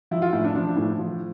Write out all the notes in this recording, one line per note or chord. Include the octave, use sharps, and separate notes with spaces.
F3 E4
F4
A2 E4
D4
F3 D4
A2
F3